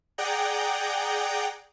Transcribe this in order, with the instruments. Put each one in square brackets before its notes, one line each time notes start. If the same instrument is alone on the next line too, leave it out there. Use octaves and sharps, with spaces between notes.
[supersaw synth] G#4 D5 F#5 G5 A#5 G6